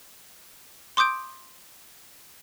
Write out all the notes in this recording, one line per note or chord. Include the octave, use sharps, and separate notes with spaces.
C6 D6 D#6 G6 D7